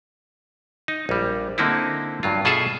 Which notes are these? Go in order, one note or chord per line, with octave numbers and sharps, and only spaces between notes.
D#4
A#1 G3
D3 A#3 C4 D#4 E4
G2 F#3 F4
B2 F4 G#4 A4 E5 A5